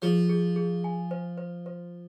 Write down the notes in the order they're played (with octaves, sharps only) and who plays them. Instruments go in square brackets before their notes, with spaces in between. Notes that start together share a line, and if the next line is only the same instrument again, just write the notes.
[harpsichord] F3 [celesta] G#4
[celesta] G#4
G#4
G#5
C5
C5
C5